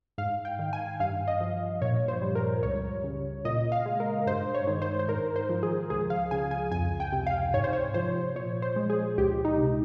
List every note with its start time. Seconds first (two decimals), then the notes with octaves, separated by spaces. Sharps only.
0.18 G#2 F5
0.45 G5
0.59 D#3
0.73 G#5
1.00 G2 F5
1.28 D#5
1.41 F3
1.82 A#2 C#5
2.08 C5
2.22 G3
2.35 A#4
2.63 C#2 C#5
3.04 C#3
3.45 A#2 D#5
3.72 F5
3.86 G#3
4.00 A#4
4.26 G2 C5
4.55 C#5
4.67 D#3
4.82 C5
4.99 C5
5.09 G#2 A#4
5.36 C5
5.49 F3
5.63 G#4
5.90 C#2 G#4
6.10 F5
6.31 C#3 G#5
6.51 G#5
6.72 F2 G#5
7.00 G5
7.12 C3
7.27 F5
7.54 G#2 C#5
7.64 C5
7.73 C#5
7.94 F3 C5
8.35 A#2 C#5
8.62 C5
8.76 G#3
8.90 G#4
9.18 C#2 G4
9.45 D#4
9.58 C3